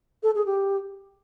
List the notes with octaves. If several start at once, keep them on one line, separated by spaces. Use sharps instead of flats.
A4
G#4
G4